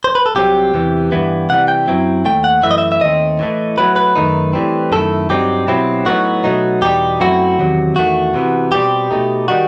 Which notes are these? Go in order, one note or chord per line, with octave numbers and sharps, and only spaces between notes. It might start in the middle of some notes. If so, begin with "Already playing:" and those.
C5
B4
A4
C2 C3 F#3 C4 G4
E2 C3 E3
G2 E3 B3 E4
C3 E3 G3 F#5
G5
F#2 F#3 C4 E4
D#2 D#3 A3 G5
F#5
F#2 E3 A3 E5
D#5
E5
E5
D#2 D#3 A3 C4 D#5
A2 E3 A3
A2 F#3 B3 E4 B4
B4
F#2 D#3 A3 D#4
A2 E3 G3 C4
F#2 D#3 A3 E4 A4
G2 F#3 C4 D#4 G4
B2 F#3 C4 E4
A2 F#3 B3 D#4 F#4
B2 F#3 A3 D#4
E2 B2 G3 D#4 G4
F#2 F#3 A3 C4 E4 F#4
E2 C3 D#3 F#3
E2 D#3 A3 F#4
C3 E3 B3
B2 G3 C4 G4
B2 A3 D#4
D#3 G3 D#4 F#4